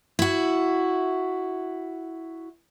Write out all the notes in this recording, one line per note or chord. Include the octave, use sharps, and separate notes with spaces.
E4 F#4